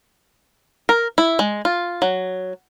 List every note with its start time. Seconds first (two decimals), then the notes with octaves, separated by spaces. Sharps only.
0.89 A#4
1.18 E4
1.39 G#3
1.65 F4
2.02 F#3